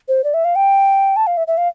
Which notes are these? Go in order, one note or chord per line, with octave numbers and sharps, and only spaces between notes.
C5
D5
E5
F5
G5
A5
F5
E5
E5
F5